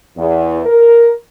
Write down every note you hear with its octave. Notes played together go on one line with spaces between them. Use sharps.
E2
A#4